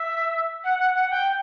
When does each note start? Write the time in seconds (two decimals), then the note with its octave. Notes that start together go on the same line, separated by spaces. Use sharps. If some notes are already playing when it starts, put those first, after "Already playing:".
Already playing: E5
0.64 F#5
0.80 F#5
0.95 F#5
1.11 G5